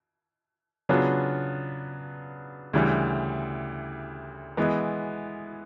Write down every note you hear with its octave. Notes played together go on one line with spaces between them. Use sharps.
C#3 F#3 B3 D4 F4
D2 C#3 E3 G3
E3 G#3 B3